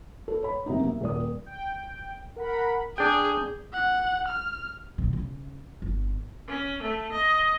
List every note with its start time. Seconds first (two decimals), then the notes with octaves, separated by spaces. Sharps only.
0.28 A4 B4
0.43 C#5 B5
0.66 F#2 C3 G3 A#3 B3 D#4
0.84 E5
1.01 D#1 A#2 D5 D#6
1.46 G5
2.36 A#4 F#5 B5
2.98 D4 G#4 G5 G6
3.73 F#5
4.28 F6
4.98 B1 D#3
5.13 C#3
5.82 G1
6.48 C#4
6.82 A3
7.12 D#5